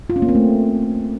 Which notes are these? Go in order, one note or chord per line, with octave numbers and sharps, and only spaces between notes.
F4
C#4
A#3
C4
A3